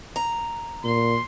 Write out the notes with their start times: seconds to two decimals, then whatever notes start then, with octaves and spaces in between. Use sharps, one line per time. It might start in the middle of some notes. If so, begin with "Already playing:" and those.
0.16 A#5
0.84 A#2 C6